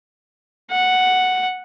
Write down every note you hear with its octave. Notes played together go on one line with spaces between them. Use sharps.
F#5